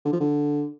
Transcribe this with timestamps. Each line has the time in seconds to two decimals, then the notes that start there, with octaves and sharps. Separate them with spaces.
0.05 D3
0.13 F3
0.20 D3